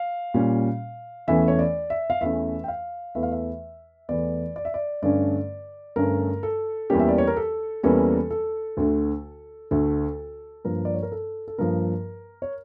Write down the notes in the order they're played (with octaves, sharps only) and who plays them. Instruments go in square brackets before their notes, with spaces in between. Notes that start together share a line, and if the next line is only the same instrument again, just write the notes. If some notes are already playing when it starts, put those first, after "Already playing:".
Already playing: [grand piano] F5
A#2 G3 C#4
E2 E3 A3 C#4 E5
C#5
D5
E5
F5
E2 E3 A3 C#4 E5
G5
F5
E2 E3 A3 E5
F5
E5
E2 E3 A3 D5
D5
E5
D5
G2 D3 A3 C#4 D5
G2 D3 A3 C#4 A#4
A4
E2 E3 G3 A#3 C#4 G4
E5
D5
C#5
A#4
A4
E2 E3 G3 A#3 C#4 A4
A4
D2 D3 A3
D2 D3 A3 A4
G2 F3 A#3 A#4
D5
C#5
A#4
A4
A4
G2 F3 A#3 A#4
C#5